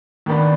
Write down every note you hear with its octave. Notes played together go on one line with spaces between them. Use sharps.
D#2 D#3 B3 D4